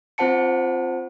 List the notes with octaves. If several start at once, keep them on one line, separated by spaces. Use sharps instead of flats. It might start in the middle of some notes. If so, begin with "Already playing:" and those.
C4 F4 C5 F#5 A5 C#7